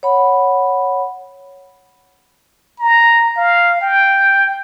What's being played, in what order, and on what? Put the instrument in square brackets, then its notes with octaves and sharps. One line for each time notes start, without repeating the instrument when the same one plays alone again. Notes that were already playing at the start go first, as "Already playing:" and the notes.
[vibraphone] C#5 F#5 B5
[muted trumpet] A#5
F5
G5